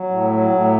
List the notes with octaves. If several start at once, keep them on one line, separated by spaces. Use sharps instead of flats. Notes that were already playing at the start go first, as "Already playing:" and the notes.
Already playing: F#3
A2
F#3
A2